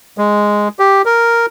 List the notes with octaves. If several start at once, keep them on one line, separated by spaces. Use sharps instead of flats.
G#3
G4
A#4